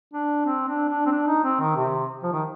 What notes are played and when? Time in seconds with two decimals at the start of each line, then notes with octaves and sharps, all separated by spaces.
0.14 D4
0.46 C4
0.68 D4
0.89 D4
1.06 C4
1.11 D4
1.27 D#4
1.44 C4
1.60 D#3
1.76 C3
2.23 F3
2.33 D#3